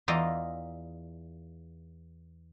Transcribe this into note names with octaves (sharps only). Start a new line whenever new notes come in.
E2 E3 F4 D5 D#5 A#5